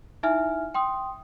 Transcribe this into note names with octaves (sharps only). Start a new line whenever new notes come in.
D#4 E4 E5 G#5 F6
G5 C6 D#6